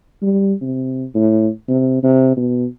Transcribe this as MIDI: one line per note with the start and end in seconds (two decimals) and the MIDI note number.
0.22 0.53 55
0.61 1.05 48
1.15 1.48 45
1.68 2.02 48
2.03 2.36 48
2.37 2.65 47